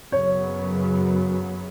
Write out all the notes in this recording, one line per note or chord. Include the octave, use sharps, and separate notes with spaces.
F#2 C#3 F#3 B3 C#5